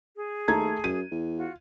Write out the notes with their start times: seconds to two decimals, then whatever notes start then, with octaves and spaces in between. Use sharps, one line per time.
0.17 G#4
0.48 D#2 A3 A#5 G#6
0.84 F#2 D#7
1.11 E2
1.37 F4 F#4